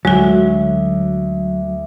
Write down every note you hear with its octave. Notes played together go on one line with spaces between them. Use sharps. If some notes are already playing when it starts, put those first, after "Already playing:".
D2 F#3 G#3 F#4